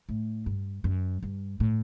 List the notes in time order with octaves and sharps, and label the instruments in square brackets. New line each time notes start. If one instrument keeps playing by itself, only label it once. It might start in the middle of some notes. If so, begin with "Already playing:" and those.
[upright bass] A2
G2
F#2
G2
A2